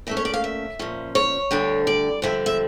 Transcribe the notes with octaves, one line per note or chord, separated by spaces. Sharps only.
A#2 A3 C#4 E5
C#5
D5
F5
E5
A#2 F3 C#4
C#5
D2 D3 G3 D4
D5
F2 D3 G3 E5
E5